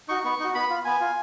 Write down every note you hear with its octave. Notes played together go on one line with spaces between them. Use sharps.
D#4 F#4 C#6
B3 C#6
D#4 F#4
B3 B5
F4
B3 G#5
F4